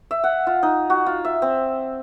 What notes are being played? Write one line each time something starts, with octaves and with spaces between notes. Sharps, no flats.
E5
F#5
F4
D#4
F#4
F4
E5
C4